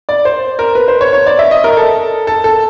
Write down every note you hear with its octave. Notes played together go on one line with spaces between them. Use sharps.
D5
C5
A#4
B4
C5
C#5
C#5
D5
E5
D#5
A#4
A4
A4
A4